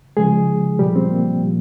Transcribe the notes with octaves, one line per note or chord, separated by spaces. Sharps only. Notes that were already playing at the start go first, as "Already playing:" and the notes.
C#3 F3 G#3 G#4
A#2 F3 G3 G4
C4
A#3
A#2 F3